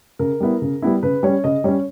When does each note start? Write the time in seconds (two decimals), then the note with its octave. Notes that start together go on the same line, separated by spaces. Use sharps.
0.19 C#3 A#4
0.40 G3 B3 E4
0.62 C#3
0.82 G3 B3 E4
1.03 C#3 B4
1.23 G3 C#4 C#5
1.44 C#3 D#5
1.64 G3 C#4 C#5